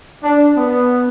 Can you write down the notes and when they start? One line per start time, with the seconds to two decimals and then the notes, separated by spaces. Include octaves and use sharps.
0.24 D4
0.58 B3